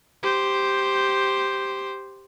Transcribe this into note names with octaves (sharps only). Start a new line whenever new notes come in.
G4 C5